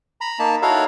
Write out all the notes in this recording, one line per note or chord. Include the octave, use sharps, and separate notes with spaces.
A#5 B5
A#3 D#4 A5
D#4 E4 F#4 A4 C#5 F5